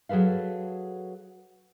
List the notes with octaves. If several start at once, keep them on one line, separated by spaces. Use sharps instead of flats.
F#3 G#4 A4 B4 F5